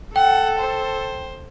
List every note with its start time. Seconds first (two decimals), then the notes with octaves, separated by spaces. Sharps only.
0.16 A4 F#5 G5
0.58 C5